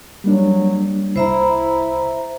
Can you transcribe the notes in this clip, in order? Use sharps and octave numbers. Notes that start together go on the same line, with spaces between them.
F#3 G3 A#3 D4
C2 E4 C5 E5 A#5